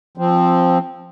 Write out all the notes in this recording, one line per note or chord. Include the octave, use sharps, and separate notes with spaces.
F3 C4